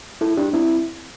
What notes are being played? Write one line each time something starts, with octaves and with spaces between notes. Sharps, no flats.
E4 A4
D4 G4
C4 E4